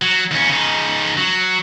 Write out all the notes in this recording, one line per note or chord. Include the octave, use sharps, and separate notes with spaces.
F#3
D#2 C#4
C#3 D#4
F#3